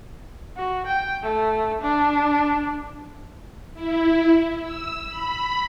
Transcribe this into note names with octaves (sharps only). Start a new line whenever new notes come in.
F#4
G5
A3
D4
E4
E6
B5